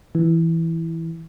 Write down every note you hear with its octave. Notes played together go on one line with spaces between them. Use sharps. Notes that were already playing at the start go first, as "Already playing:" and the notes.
E3